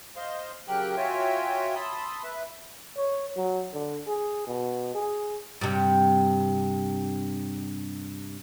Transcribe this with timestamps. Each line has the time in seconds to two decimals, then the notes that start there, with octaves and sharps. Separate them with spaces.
0.16 C5 D#5 F5 C6
0.68 C#3 F#3 G4 A#4 G5 F#6
0.97 F4 F#4 C#5 E5 G5 G#5
1.75 A5 B5 C6 D#6 E6
2.24 B4 E5
2.97 C#5
3.36 F#3
3.73 D3
4.07 G#4
4.47 B2
4.95 G#4
5.61 G2 C3